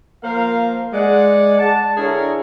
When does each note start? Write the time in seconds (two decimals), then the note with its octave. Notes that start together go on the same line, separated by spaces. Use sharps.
0.24 F3 A#3 A#4 C5 F5
0.93 G#3 D5 F#5
1.59 A5
1.97 D3 D4 E4 G#4 A#4 C#5